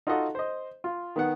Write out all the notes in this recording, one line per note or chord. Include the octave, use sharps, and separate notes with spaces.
D#4 F4 F#4 A4 D#5 F#5
C5 D#5
F4
D#3 B3 F#5